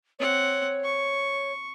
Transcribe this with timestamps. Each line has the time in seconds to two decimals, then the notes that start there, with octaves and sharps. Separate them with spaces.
0.19 C4 C#5 F#5
0.84 C#6